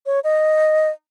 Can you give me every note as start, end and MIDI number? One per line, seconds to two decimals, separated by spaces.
0.06 0.20 73
0.24 0.89 75